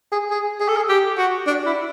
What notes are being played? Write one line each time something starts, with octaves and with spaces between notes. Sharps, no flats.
G#4
G#4
G#4
A4
G#4
G4
F#4
D4
E4